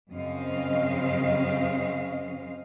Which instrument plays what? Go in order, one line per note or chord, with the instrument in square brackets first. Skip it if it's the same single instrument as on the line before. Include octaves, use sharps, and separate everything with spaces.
[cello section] F#2 C#3 C4 D#5 F5